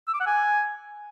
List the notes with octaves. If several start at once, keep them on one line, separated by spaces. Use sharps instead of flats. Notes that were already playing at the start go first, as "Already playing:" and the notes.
E6
D6
F#5
G#5